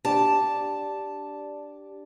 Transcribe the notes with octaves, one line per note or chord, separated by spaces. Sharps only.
D4 G4 D5 A5